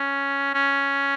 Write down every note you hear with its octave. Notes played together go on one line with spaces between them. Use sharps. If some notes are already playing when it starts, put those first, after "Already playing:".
Already playing: C#4
C#4